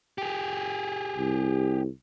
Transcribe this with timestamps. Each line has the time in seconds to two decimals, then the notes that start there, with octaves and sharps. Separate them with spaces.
0.18 G4 G#4
1.18 C2